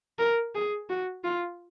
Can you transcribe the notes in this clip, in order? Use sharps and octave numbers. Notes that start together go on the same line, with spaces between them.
A#4
G#4
F#4
F4